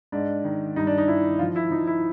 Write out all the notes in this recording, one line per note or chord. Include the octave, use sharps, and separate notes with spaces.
G#2 D4
D#3
G2 D#4
D4
D#4
D#3 E4
F3 F4
E4
F3 D#4
E4